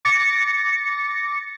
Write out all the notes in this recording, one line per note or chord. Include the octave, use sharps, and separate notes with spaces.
D6 A6 A#6 C#7